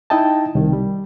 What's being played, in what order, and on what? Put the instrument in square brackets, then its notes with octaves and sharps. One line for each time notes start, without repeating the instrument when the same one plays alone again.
[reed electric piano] D#4 E4 D#5 G5 A5
C2 D#3
G3